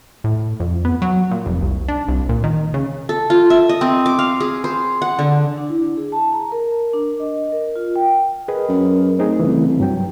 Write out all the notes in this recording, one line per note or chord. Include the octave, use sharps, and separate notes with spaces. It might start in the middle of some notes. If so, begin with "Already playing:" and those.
A2
F2
B3
F#3
A#2
F1
C2
D4
C2
A#2
D#3
C#3
A4
F4
E5
D#5
C4
D6
F5
G#4
C5
F#5
D3
D4
E4
G#4
A5
A#5
A#4
D4
D#5
A#4
F4
G5
G#4 A#4 B4 D#5
F#2
A3 C4 D#4 G#4
C2 C#3 E3
G2 F#3 G5